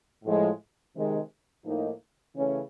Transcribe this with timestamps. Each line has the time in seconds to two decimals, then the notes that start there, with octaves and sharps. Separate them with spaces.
0.23 A2 F3 G#3
0.94 C3 D#3 G#3
1.64 A2 F3 A#3 D#4
2.35 C#3 E3 A3 C#4